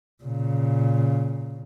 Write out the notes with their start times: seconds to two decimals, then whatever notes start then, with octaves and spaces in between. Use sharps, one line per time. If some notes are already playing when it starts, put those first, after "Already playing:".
0.23 A#2 C#3